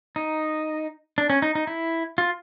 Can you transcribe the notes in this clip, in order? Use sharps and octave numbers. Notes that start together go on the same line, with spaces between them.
D#4
D4
C#4
D#4
D#4
E4
F4